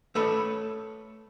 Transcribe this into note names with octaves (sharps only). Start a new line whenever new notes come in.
A3 A4 B4 C#5